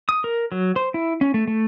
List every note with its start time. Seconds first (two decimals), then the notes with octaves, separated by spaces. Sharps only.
0.09 D#6
0.24 A#4
0.52 F#3
0.76 C5
0.94 E4
1.21 C#4
1.34 A3
1.47 A3